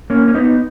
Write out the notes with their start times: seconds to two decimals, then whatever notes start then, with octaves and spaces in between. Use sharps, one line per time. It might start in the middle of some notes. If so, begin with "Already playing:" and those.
0.10 A#3 C#4
0.28 C#4
0.35 B3 D#4